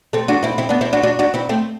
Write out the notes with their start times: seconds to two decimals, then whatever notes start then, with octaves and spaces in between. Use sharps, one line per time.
0.13 A3 C4
0.28 D4 F#4
0.43 C4 E4
0.58 C4 E4
0.69 B3 D4
0.81 C4 E4
0.93 D4 F#4
1.03 D4 F#4
1.19 D4 F#4
1.34 C4 E4
1.49 A3 C4